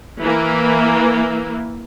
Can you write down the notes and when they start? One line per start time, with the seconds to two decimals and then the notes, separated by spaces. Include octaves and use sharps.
0.20 E3 A#3